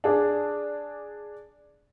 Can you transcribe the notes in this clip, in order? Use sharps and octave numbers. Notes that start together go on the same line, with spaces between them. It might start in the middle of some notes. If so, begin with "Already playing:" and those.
D4 G#4 D5